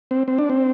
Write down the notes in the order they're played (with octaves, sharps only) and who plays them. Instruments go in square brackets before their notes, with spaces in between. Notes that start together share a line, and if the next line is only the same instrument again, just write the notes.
[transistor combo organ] C4
C4
D4
C4